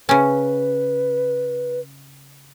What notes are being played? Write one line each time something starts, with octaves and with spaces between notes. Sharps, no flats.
C#3 C#4 B4